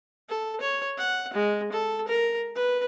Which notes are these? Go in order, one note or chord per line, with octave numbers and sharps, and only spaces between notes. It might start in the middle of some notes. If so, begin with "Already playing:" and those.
A4
C#5
F#5
G#3
A4
A#4
B4